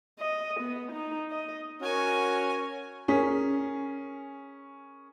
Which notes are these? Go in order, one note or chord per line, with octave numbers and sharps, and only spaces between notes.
D#5
B3
D#4
D#5
C#4 F#4 A#4 G#5
C#4 G#4 A#4 B6